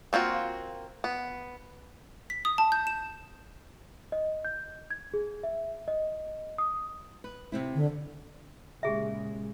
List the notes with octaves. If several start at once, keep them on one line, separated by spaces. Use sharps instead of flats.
A#3 C4 F4 F#4
B3
B6
D#6
A5
G6
E7
D#5
G6
G#6
G#4
E5
D#5
D#6
B4
C3 C4 E4
D3
A#2 C#3 G#3 G4 G#4 E5